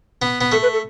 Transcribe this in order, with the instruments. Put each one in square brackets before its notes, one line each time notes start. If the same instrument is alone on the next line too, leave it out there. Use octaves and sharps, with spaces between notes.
[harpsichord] B3
B3
[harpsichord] A3 [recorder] A4
[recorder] B4
A4